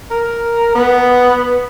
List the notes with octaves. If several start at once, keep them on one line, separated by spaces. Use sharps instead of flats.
A#4
B3